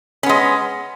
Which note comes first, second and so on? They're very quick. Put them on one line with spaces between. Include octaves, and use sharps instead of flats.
C#4 B3 G#3